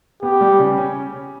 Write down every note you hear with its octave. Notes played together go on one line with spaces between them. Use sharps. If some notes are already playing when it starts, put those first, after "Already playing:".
B3 G4
G3
C#3
C#4